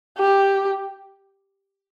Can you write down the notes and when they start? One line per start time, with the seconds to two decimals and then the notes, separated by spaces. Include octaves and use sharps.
0.18 G4